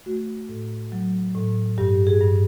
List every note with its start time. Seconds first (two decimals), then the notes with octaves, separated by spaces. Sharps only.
0.06 A3 F#4
0.49 A2
0.92 F#3
1.35 A2
1.78 G2 G4
2.07 G#4
2.21 G2